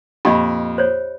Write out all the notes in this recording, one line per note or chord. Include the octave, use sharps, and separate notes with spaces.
F2 A#2 G4 D#5 B5
C5 C#5